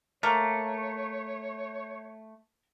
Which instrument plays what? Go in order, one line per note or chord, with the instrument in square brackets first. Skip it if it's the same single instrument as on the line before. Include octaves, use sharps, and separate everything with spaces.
[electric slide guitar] A3 [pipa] A#3 [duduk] C#5